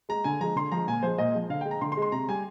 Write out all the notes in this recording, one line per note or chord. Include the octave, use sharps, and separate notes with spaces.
G#3 A#5
D3 G#5
F3 G#3 A#5
D3 C6
F3 G#3 A#5
A#2 G#5
F3 G#3 C5
A#2 D#5
F3 G#3
D3 F5
G#3 G5
A#5
D3 C6
C6
G#3
C6
C3 A#5
G3 G#5